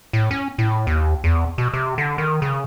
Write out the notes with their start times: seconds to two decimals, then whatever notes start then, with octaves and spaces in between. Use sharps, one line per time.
0.13 A2
0.31 C#4
0.58 A2
0.87 D#2
1.24 E2
1.58 B2
1.74 C3
1.98 D3
2.18 D#3
2.42 C#3